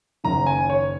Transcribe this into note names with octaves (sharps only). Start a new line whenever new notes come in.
F#1 F#2 D#3 A#5
G#5
C#5